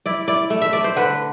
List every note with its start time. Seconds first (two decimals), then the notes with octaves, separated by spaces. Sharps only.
0.06 E4 D5
0.28 E4 D5
0.50 A3
0.62 E5
0.73 A3 D5
0.84 C5
0.96 D3 B4